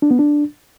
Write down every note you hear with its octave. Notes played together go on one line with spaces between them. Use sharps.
D4
B3
D4